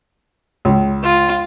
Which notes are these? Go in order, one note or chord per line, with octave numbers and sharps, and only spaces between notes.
C#2
F4